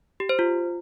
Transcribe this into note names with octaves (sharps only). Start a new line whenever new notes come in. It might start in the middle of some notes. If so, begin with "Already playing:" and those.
G4
C5
F4